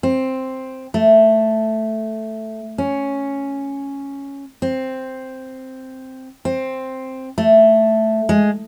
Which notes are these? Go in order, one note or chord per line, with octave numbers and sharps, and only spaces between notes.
C4
A3
C#4
C4
C4
A3
G#3